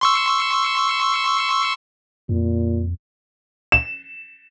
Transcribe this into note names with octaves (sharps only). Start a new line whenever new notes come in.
C6 C#6 E6
F2 A#2
E7